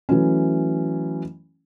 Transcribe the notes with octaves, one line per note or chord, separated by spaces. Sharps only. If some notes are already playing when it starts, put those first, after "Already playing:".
E3 F#3 A3 C#4